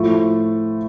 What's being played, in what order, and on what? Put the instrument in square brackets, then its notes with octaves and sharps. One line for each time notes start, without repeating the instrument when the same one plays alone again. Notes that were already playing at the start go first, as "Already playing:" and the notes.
Already playing: [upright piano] A2 F3 A3 C#6